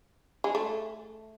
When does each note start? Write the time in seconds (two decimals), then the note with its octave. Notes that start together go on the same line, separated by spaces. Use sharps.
0.44 G#3
0.55 A3